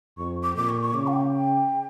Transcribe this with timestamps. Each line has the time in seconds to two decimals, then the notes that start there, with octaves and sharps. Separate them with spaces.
0.18 F2 C#6
0.43 D6
0.56 A#2 D6
0.69 C#6
0.82 C#6
0.94 C#3 D6
1.07 F5
1.13 G5